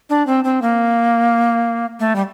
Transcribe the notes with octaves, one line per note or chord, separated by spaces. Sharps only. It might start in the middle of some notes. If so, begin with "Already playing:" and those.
D4
C4
C4
A#3
A3
G3